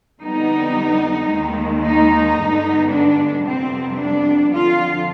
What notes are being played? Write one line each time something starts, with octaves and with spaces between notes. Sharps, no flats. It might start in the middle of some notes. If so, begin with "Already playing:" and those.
F2 D3 G3 B3 D#4
D#2 D#3 G#3
D#4
G2 D3 G#3 B3
D4
F2 C3 G3 B3 C4
D4
F2 D3 F3 F4